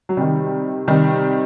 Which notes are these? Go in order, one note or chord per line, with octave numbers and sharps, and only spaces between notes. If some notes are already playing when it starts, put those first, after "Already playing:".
F#3
C3 D#3 G3
C3 D#3 G3